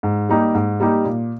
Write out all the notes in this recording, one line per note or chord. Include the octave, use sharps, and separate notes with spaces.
G#2
G3 A#3 D#4 G4
G#2
G3 A#3 D#4 G4
A#2